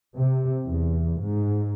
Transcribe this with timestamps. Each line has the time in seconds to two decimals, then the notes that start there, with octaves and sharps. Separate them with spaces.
0.16 C3
0.66 E2
1.22 G#2